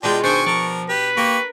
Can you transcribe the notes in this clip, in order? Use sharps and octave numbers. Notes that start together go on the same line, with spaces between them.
B2 G#3 D4 F4 G5
D#3 D4 C5 G5 G#5 C#6
F3 A#4 D5
G4 B4
A#3 G4 A#4 C#6